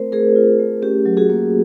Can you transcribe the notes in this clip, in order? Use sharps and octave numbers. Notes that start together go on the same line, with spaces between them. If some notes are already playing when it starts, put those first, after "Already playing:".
Already playing: A3 C4 F4 A#4 C5
A3 G#4 A#4
F4
A3
C#4 G4
F#3
F#4 G#4
A#3